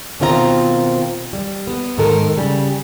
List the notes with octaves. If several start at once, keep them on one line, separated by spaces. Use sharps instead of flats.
B2 D#3 C4 F4 D#5 A#5
G3
B3
G#2 D#3 D#4 A4 A#4
C#3 G3